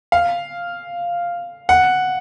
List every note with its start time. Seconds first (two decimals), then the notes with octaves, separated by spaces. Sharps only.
0.12 F5
1.69 F#5